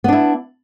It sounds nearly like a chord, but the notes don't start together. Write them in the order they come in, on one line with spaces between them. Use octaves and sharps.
B3 D4 E4